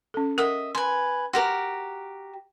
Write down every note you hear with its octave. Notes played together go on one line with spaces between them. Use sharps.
C#4 A4
A#4 D#5 E5 F#5
B4 G#5 C6
F#4 G4 A#4 C6